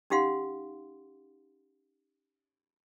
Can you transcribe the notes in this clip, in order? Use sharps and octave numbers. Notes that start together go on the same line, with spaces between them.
C#4 D#4 G4 F5 F#5 C6